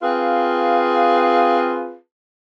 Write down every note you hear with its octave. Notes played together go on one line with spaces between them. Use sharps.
C4 F4 G#4 B4 F5